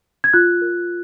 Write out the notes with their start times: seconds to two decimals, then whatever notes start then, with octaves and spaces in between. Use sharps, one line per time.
0.24 G#6
0.33 F4 F#6
0.62 A#4